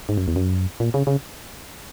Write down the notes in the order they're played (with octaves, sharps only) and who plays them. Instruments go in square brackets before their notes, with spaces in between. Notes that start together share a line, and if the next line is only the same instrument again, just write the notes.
[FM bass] G#2
F#2
E2
F#2
A#2
C#3
C#3